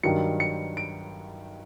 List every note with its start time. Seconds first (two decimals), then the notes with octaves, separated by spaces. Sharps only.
0.03 G2 D#3 F#3 C#7
0.40 C#7
0.77 D7